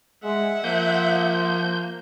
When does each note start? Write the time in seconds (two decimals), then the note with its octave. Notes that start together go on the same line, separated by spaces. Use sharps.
0.24 G#3 E5 F#5
0.64 F3 A#3 G6